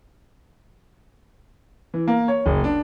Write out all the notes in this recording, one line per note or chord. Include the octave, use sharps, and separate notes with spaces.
E3
A#3
C#5
F#1
D4